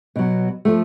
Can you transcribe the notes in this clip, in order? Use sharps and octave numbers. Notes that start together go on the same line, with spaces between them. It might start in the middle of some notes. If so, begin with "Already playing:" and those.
B2 F#3
F3 A3